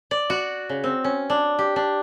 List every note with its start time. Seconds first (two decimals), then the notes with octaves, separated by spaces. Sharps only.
0.11 D5
0.30 F#4
0.69 C#3
0.84 C4
1.04 C#4
1.30 D4
1.59 G4
1.76 D4